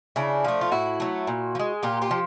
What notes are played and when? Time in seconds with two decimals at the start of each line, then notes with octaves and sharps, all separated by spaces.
0.16 C#3 D4 E4
0.44 F3 A3
0.61 F4
0.72 A2 E4 F#4
1.00 F#3 A3
1.27 A#2
1.55 F3
1.59 G#3
1.83 A#2 F4 G4
2.02 F4 G4
2.11 F3